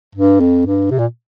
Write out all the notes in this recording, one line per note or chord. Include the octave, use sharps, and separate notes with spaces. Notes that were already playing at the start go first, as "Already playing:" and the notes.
G2
F2
G2
C3
A#2